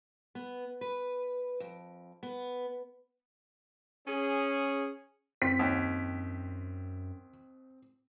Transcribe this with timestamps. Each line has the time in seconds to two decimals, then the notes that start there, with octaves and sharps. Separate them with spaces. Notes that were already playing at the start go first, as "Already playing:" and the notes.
0.35 B3
0.81 B4
1.60 F2
2.23 B3
4.08 C#4 G#4
5.42 F#2 C4 B6
5.59 D#2